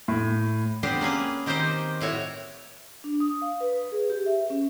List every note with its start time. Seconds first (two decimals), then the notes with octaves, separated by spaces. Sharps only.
0.08 A2
0.83 B3 C4 D4 G4 B4 C5
1.01 A#3 C#4 G#4 B4
1.46 D#3 C4 G4 A#4 C5 D#5
2.01 A2 E4 F#4 C#5
3.04 D4
3.20 D#6
3.42 F5
3.60 B4
3.92 G#4
4.10 G4
4.26 E5
4.50 C#4